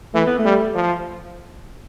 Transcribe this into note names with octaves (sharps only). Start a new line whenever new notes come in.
E3 A3
B3
A3
G3
F3